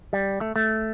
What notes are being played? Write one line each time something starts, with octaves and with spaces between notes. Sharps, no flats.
G3
A3
A3